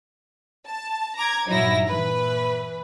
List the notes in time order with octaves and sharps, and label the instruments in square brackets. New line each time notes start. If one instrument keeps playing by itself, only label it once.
[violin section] A5
A#5 D6 G#6
[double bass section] G2 A#2 F#3 [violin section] D#4 E4 A#6
[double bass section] A#2 E3 [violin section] B4